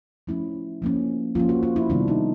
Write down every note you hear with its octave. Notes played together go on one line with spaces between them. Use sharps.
F3 A3 C#4 E4
F3 A#3 C#4
F3 A#3 C#4 F4
F#4
F4
E4
C3 D#3 G3 B3 D4
D#4